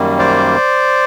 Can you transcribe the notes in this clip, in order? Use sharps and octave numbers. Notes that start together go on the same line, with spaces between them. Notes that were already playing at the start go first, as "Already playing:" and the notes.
Already playing: F#2 D#3 G3 A#3
C5 D5